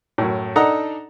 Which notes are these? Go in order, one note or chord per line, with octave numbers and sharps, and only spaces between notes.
F#2 A2
D4 D#4 A4 D#5 F#5 A#5